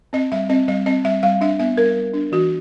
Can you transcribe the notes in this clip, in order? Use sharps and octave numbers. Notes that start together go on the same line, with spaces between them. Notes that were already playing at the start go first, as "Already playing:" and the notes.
C4 D#5
G3 E5
C4 D#5
G3 D#5
C4 D#5
G3 E5
G3 F5
D4 E5
B3 E5
G3 A#4
G3
D4
E3 F#4